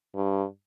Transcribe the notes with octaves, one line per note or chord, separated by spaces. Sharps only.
G2